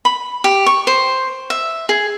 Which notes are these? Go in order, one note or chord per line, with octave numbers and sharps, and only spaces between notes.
B5
G4
C#6
C5
E5
G#4